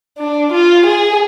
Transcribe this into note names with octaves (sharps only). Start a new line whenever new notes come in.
D4
F4
G#4